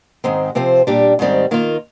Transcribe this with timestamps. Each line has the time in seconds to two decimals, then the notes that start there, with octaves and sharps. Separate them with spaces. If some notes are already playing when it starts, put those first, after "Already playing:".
0.24 G#2 D#3 G#3 C4
0.55 C3 F3 C4 F4 C5
0.87 A#2 G3 D4 G4
1.19 G#2 D#3 G3 C4
1.51 D#3 A#3 F4